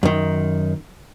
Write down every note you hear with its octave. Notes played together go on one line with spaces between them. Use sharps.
F#2 D#3